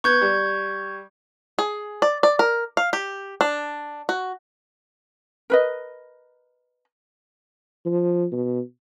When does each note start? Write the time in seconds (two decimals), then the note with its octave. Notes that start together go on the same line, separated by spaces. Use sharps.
0.04 B3 C#6 G6 G#6
0.22 G3
1.59 G#4
2.02 D5
2.23 D5
2.39 A#4
2.77 F5
2.93 G4
3.41 D4
4.09 F#4
5.50 A#4 B4 D#5
7.85 F3
8.32 B2